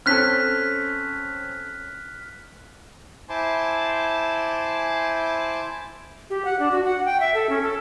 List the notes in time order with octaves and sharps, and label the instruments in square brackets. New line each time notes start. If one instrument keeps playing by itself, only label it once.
[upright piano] C4 C#4 A4 [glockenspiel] F6 F#6 B6
[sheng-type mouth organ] E4 C5 G#5 A5 C6 D6
[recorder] G4
F#5
D4
F#4
F#5
G5
E5
A4
C#4
A4